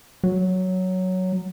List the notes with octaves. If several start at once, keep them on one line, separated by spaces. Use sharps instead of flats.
F#3